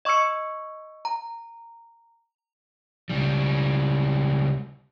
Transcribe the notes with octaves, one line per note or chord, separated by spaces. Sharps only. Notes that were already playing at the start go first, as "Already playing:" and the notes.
D#5 C#6 D6 E6 C#7
A#5
C#2 G3